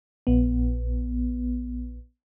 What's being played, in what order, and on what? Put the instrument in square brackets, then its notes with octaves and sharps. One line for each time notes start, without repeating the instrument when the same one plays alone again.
[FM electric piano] A#1 B3